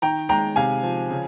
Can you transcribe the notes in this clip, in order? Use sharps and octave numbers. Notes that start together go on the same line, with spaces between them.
D#3 G5 A#5
G#3 G5 A#5
C3 F5 G#5
F3
C#3